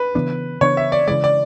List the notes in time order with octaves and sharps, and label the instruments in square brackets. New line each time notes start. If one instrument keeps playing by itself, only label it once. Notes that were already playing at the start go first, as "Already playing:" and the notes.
Already playing: [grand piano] B4
[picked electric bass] C#3 E3 B3 D4
[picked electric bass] C#3 E3 B3 D4 [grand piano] C#5
[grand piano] E5
D5
[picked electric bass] C#3 E3 G#3 [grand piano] D5
[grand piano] D5